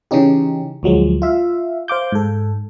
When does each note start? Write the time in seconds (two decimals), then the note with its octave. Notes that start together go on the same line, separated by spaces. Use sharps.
0.11 C#3 E3 C#4 D#4 G4
0.83 D2 F3 F#3 G#3
1.22 F4 E5 F5
1.88 C5 F5 D6 G6
2.12 G#2 A4